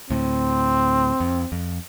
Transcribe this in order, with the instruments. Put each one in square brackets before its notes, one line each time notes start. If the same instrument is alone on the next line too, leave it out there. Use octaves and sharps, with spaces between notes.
[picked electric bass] D2 A2 [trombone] C4
[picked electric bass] F2
F2